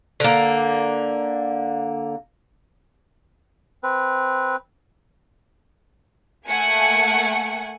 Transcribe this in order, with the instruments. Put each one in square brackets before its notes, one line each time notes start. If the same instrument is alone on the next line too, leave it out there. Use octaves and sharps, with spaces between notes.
[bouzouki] D3 A#3
[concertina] C4 B4
[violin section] A3 A#3 F#5 G#5 C#7